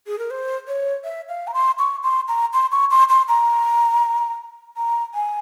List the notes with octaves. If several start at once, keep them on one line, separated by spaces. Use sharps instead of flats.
G#4
A#4
C5
C#5
E5
F5
A#5
C6
C#6
C6
A#5
C6
C#6
C6
C6
A#5
A#5
G#5